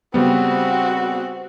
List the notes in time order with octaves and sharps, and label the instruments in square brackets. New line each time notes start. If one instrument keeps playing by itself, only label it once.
[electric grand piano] C#3 G3 B3 [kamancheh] C4 F#4